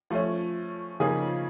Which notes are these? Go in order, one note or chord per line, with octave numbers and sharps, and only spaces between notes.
F3 A3 C#4
C#3 F3 A#3 D#4 G#4